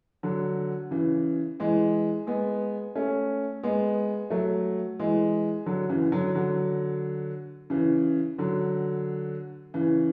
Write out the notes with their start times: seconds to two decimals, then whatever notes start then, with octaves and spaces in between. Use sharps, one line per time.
0.23 D3 F#3
0.91 C#3 E3
1.60 E3 G#3
2.27 G#3 B3
2.95 A3 C#4
3.63 G#3 B3
4.30 F#3 A3
5.00 E3 G#3
5.66 D3 F#3
5.90 C#3 E3
6.12 D3 F#3
6.35 D3 F#3
7.70 C#3 E3
8.38 D3 F#3
9.74 C#3 E3